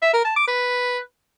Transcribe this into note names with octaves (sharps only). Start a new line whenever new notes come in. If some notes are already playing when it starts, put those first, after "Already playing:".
E5
A#4
A5
D6
B4